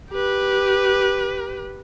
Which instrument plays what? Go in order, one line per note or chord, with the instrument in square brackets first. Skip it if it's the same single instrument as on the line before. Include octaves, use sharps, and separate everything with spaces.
[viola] G4 B4